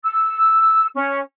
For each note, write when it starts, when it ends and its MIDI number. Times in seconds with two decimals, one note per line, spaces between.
0.04 0.86 88
0.94 1.19 61